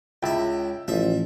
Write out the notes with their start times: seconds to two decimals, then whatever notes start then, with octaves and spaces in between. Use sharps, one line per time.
0.23 C#2 E4 E5 G5
0.88 A1 F3 E5